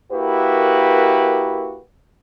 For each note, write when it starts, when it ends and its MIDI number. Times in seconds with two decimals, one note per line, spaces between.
0.12 1.79 58
0.12 1.79 64
0.12 1.79 66
0.12 1.79 67
0.12 1.79 70
0.12 1.79 71